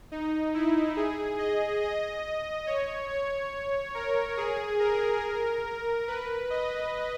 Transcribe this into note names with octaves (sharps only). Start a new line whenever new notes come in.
D#4
E4
G#4
D#5
D#5
C#5
C#5
A#4
G#4
A#4
B4
D#5